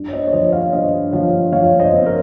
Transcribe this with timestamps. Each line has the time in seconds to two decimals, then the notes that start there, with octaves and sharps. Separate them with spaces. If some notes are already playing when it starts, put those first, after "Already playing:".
Already playing: G2
0.09 C#5
0.13 C5 D#5
0.27 C#5
0.33 F3 C5 D#5
0.53 C#5 F5
0.73 G2 C5 D#5
1.13 F3 C#5 F5
1.52 F3 C#5 F5
1.79 C5 D#5
1.93 C4
2.06 A#4 C#5